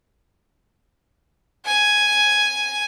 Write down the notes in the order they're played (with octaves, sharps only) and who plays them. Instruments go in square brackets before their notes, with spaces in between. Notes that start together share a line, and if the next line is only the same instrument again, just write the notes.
[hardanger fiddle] G#5